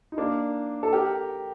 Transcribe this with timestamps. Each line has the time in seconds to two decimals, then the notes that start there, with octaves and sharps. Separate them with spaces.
0.12 D#4
0.18 A#3 D4
0.83 A4
0.93 G4 A#4